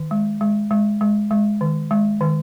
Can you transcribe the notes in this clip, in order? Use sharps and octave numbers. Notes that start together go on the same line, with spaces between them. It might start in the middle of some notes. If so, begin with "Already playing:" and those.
Already playing: D#3
G#3
G#3
G#3
G#3
G#3
D#3
G#3
D#3